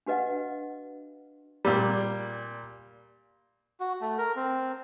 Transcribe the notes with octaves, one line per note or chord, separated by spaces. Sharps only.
D4 F#4 B4 D#5 F5 F#5
A#2 G3
F#4
A3
A#4
C4